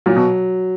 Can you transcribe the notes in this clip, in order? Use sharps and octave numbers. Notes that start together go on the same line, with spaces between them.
A#2 F#3
B2